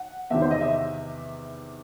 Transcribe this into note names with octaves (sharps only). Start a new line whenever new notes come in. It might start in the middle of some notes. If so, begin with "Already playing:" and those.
Already playing: F#5
E2 C3 D#3 E5
C5
D#5
E5